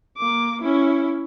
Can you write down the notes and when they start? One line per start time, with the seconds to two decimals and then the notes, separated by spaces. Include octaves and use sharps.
0.18 A#3 D6
0.62 C#4 E4